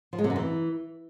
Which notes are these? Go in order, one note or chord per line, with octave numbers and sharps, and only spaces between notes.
F3
G#3
C3
F#2
E3